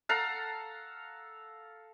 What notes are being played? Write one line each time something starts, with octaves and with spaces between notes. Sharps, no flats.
A4 F5 F#5 A#5